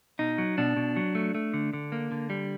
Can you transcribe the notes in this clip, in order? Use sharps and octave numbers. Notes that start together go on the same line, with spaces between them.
B2 D#4
F#3
B2 D4
B2
F#3
A3
A3
D3
D3
A#3
D3
G3